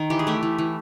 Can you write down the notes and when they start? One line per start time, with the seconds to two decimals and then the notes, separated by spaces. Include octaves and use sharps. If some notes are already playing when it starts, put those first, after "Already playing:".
Already playing: D#3
0.10 E3 G4
0.19 G#4
0.27 A3 G4
0.43 E3
0.58 E3